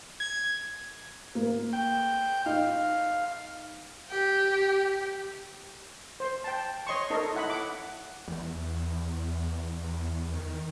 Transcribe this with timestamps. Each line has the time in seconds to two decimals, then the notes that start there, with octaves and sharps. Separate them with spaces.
0.20 G#6
1.35 A#3
1.73 G5
2.46 D#4 F5
4.11 G4
6.20 C5
6.44 G5 A5
6.87 C#5 D#5 C6 C#6
7.10 D#4 A4 A#4 C#5 D#5
7.35 E4 F#5 B5
7.50 F#5 D6
8.28 E2
10.34 D#3